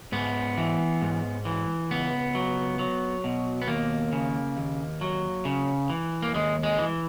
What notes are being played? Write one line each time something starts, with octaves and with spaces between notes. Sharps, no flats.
G#2 B3
E3
G#2
E3
C#2 B3
F#3
F#3
B2
B3
D#2 A#3
C#3
D#2
F#3
C#3
E3
A#3
D#2 G#3
G#3
E3